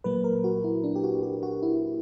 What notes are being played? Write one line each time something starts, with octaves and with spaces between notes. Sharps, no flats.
A#2 F#3 A#3 B4
A#4
F#4
E4
D4
G4
F#4
G4
F#4
E4